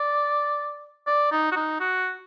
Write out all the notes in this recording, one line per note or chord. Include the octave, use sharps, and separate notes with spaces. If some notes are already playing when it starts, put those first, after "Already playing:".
Already playing: D5
D5
D#4
F#4
D#4
F#4